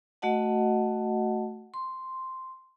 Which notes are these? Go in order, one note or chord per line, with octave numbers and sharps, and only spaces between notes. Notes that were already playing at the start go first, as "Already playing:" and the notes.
A3 F#4 D#5 F#5 A5
C6